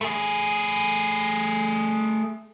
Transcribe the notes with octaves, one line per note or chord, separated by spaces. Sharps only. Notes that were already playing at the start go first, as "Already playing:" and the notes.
A3 G#4